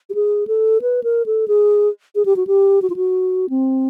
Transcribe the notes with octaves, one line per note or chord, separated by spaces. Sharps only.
G4
G#4
A4
B4
A#4
A4
G#4
G#4
G4
F#4
G4
F#4
F4
F#4
C4